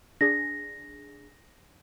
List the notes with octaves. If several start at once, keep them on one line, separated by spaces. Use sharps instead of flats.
D4 G#4 A#6